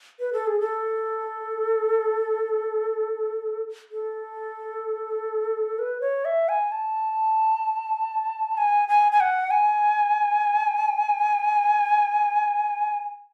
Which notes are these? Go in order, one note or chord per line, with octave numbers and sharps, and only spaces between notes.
B4
A4
G#4
A4
A4
B4
C#5
E5
G#5
A5
G#5
G#5
G#5
F#5
G#5